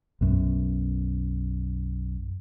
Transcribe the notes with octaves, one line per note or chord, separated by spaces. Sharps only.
B1 F#2